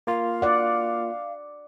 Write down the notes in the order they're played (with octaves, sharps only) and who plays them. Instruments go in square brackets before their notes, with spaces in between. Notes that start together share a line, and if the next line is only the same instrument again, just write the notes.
[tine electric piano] A#3 F4 [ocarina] F5
[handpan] D5 F#5